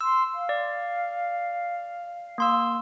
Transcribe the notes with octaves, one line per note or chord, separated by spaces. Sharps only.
C6 E6
F5
D5
A#3 C6 E6